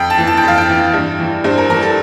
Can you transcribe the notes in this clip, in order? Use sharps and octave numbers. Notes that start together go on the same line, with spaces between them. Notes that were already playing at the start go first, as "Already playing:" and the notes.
Already playing: F2 G5
A5
E3
A5
G5
F2 F5
G5
E3
G2
E3
G2 C5
A#4
E3 A#4
A4